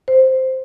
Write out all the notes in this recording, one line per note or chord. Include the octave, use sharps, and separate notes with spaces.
C5